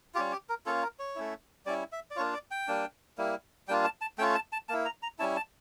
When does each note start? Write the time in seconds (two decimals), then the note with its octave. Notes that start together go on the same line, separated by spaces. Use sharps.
0.15 G3 C#4 F4 G4
0.32 G4
0.49 A#4
0.66 A#3 C#4 F4 A4
0.83 A#4
0.99 C#5
1.16 A3 C#4 E4
1.66 G3 C#4 E4 D5
1.92 E5
2.11 D5
2.16 A#3 D4 F4 C#5
2.33 D5
2.51 G5
2.68 G3 A#3 D4
3.18 G3 A#3 E4
3.68 G3 A#3 D4 F4 G5
3.84 A5
4.01 A5
4.18 A3 C#4 F4 G5
4.35 A5
4.53 A5
4.69 A#3 E4 A5
4.85 A#5
5.03 A#5
5.19 G3 C#4 E4 A5
5.36 A5